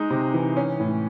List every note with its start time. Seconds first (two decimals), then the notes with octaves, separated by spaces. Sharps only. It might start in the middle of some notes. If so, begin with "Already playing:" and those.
Already playing: G#3 D#4
0.10 C3
0.34 E3
0.57 C#4
0.80 A2